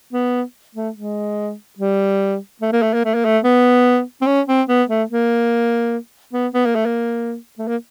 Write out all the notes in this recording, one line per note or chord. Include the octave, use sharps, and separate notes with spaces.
B3
A3
G#3
G3
A3
A#3
A3
A#3
A3
A#3
A3
B3
C4
C#4
C4
B3
A3
A#3
B3
B3
A#3
A3
A#3
A3
A#3